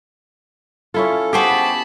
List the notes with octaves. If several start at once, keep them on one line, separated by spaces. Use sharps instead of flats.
C#4 E4 F4 A4
B3 G4 G#4 C5 A5 B5 C#6